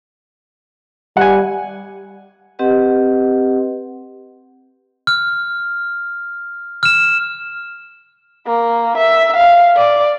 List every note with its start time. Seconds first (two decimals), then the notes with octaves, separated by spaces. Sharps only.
1.17 G3 F#5 G#5
2.59 C4 G4 B4 D#5 F#5
5.07 F6
6.83 F6 E7
8.47 A#3
8.98 E5
9.36 F5
9.76 D5